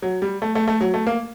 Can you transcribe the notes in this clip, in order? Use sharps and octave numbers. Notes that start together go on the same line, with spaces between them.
F#3
G3
A3
A3
A3
F#3
A3
A#3